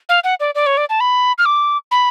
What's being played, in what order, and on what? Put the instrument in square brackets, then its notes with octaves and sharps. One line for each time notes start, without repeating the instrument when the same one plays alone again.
[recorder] F5
F#5
D5
D5
C#5
D5
A5
B5
F6
D6
B5